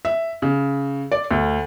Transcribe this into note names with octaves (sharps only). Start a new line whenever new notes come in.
E5
C#3
D5
D2